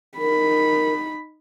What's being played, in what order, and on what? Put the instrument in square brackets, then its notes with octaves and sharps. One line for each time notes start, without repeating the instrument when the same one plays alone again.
[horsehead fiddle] D#4 B5 [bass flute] A#4